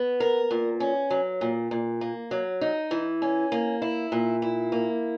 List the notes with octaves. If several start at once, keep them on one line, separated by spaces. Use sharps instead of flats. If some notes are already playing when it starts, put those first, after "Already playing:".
Already playing: B3
A#4
A#2
C#4
F#3
A#2
A#2
A#3
F#3
D#4
E3
C#4
A#3
E4
A#2
E4
A#3